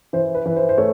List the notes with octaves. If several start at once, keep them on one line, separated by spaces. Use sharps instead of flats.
E3 C5
B4
E3 B4
C5
C5
A3 C#5